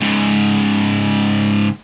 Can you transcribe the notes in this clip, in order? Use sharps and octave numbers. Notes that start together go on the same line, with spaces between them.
G#2 C#3